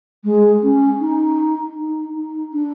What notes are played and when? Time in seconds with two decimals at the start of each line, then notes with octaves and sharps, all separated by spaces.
0.24 G#3
0.63 C#4
1.00 D#4
1.77 D#4
2.16 D#4
2.53 D4